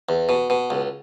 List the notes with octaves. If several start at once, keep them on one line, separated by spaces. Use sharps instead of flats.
E2
B2
B2
C#2